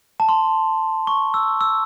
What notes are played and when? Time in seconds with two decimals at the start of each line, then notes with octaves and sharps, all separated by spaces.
0.20 A5
0.29 C6
1.07 C#6
1.34 E6
1.61 E6